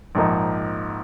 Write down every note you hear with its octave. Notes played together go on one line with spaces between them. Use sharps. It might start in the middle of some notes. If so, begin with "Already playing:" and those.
A#1 G#2 F3 A#3 D#4